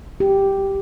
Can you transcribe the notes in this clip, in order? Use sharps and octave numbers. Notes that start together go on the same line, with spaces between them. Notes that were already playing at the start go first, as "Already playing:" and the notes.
G4